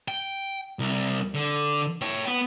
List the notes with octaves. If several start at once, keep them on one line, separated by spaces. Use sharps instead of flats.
G5
C2
D3
C#5 G5
B3